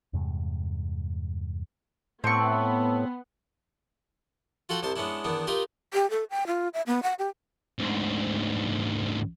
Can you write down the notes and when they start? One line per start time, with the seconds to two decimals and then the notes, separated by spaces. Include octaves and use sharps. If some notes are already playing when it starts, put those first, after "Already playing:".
0.13 E2 G2 C3 G#3
2.24 A2 B3 C4 A5 C#6 E6
4.69 F4 F#4 A4 F#5 G5
4.83 C2 C3 C5 A5
4.96 G#3 B3 C#4 D4 E4
5.24 E2 D#3 B3 D4
5.47 D#4 F4 G4 A#4 B4
5.93 G4
6.10 A4
6.31 G5
6.47 F4
6.74 E5
6.87 B3
7.03 F#5
7.19 G4
7.79 D2 G#2